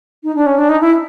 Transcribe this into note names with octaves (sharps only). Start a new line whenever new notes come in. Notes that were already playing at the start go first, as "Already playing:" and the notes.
D#4
D4
C#4
D4
D#4
E4